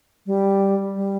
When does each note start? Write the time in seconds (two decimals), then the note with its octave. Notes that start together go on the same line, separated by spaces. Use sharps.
0.26 G3
0.95 G3